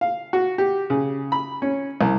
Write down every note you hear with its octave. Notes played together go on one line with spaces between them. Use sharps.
F5
F#4
G4
C#3
B5
C#4
C2